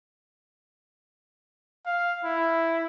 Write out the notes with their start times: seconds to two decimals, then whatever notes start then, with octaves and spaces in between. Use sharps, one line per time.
1.86 F5
2.25 E4